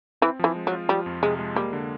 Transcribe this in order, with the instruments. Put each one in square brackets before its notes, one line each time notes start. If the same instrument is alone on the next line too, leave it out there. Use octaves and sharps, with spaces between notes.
[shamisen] E3 [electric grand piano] C4
[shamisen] E3 [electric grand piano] F3
[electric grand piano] G#3
[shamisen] F#3
[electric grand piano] F4
[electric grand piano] F3 [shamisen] G3
[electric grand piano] F2
[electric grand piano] C3 [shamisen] G#3
[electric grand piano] G#3
[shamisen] G3 [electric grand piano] A#3
[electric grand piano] D3